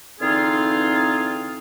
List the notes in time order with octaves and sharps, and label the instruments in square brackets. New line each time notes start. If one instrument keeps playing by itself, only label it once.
[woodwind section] D3 E3 C4 D#4 F4 G#4